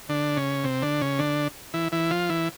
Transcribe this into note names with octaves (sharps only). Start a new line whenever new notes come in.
D3 D4
C#3 C#4
C3 C4
D3 D4
C#3 C#4
D3 D4
E3 E4
E3 E4
F3 F4
E3 E4